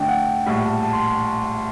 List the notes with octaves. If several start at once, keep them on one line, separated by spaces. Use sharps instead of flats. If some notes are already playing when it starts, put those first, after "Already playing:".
Already playing: D3 A3 D4 G5
F#5
A#1 A2 G3 F#5
A5
A5
C6